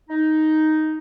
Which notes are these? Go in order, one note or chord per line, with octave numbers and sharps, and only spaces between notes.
D#4